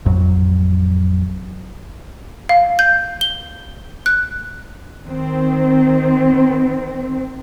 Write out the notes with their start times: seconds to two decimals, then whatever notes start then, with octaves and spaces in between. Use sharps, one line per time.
0.05 A1 F2 F#3
2.49 F5
2.79 G6
3.21 G7
4.06 F#6
5.06 D#3 C4